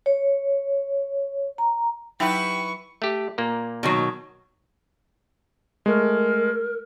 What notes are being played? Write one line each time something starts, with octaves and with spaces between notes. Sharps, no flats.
C#5
A#5
F#3 D#4 E4 G4 B4 C#6
A3 G4
A#2 A#3
B2 D#3 F#3
G#3 A3 A#4